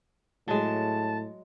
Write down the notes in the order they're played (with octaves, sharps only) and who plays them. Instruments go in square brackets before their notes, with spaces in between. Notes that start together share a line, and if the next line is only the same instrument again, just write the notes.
[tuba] A2 [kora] F#3 G#3 [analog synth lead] A5